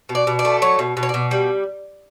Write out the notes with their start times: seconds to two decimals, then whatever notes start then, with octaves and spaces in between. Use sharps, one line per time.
0.09 B2
0.15 D5
0.27 B2
0.39 D5
0.45 A3
0.62 F#3 C#5
0.79 B2
0.97 B2
1.03 C#5
1.09 B2 D5
1.31 G3